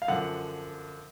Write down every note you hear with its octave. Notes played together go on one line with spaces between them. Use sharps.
F5
F#2 D3 F3 F#5